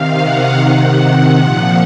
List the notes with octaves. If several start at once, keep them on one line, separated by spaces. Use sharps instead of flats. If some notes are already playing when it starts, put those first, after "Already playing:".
Already playing: C3 D#3 F5
F#5
C3 D#3 F#5
F#5
A#2 F3